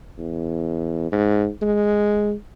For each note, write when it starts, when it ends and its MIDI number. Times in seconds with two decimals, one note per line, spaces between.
0.19 1.11 40
1.12 1.48 44
1.62 2.33 56